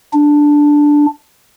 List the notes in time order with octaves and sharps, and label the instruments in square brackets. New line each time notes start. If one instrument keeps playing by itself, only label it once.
[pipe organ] D4